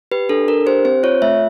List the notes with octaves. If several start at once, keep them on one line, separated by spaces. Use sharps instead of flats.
G4 B4
D4 A4
D4 A#4
G4 C5
C4 C5
F4 C#5
A3 E5